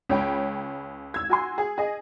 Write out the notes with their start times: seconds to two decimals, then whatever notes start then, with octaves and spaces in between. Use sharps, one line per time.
0.09 C#2 C#5 G5 B5
1.14 E6 G#6
1.29 F#4 G#5 C6
1.58 G#4
1.78 G#4 D#5